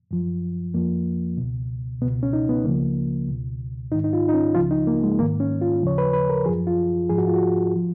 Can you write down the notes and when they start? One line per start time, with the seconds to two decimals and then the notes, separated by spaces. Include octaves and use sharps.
0.11 F#2 F3
0.74 F2 F3 A#3
1.37 C#2 B2
2.02 B2 B3
2.05 C#2
2.23 C#4
2.33 D#4
2.49 B3
2.65 C#2 C#3 F3 A#3
3.28 C#2 B2
3.92 G#2 D#3 D#4
4.04 D#4
4.13 F4
4.29 D#4
4.34 C#4
4.55 C#2 C#3 F3 F4
4.71 D#4
4.87 A#3
5.03 G#3
5.19 G#2 A#3
5.22 D#3
5.40 C#4
5.61 F4
5.83 D#2 C#3 F3 C#5
5.98 B4
6.13 B4
6.30 A#4
6.46 F3 G#4
6.49 F#2
6.67 F4
7.10 G#2 F3 G#4
7.18 F#4
7.27 F4
7.36 F#4
7.76 F3